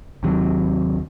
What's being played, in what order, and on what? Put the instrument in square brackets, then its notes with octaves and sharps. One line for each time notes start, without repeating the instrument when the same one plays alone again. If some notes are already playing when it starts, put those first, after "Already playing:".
[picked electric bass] D#2 C3 F#3